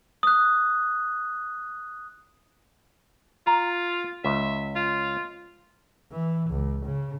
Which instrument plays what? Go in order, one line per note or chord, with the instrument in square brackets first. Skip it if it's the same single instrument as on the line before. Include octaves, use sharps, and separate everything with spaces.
[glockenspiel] D#6 F#6
[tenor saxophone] F4 [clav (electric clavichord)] A#5
[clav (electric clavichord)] C#2 [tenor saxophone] E5
[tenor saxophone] F4
[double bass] E3
C#2
C#3